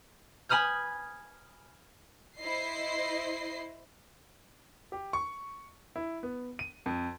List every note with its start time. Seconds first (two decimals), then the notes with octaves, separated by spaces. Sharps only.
0.49 G#5 B5 D#6 F6 G6
2.38 E4 C5 D#5 C7
4.92 G4
5.13 C#6
5.96 E4
6.23 B3
6.59 D#7
6.86 F2